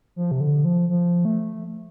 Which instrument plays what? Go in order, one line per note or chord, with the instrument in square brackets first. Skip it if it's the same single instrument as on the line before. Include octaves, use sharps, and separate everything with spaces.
[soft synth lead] F3
C3
D3
F3
F3
A3